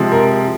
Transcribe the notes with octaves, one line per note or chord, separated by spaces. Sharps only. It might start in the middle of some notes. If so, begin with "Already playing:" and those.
Already playing: C3 F3 G#3
A#4